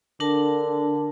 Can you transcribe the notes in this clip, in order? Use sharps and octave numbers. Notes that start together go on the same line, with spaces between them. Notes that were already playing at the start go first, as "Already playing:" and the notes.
D3 D4 A#4 A5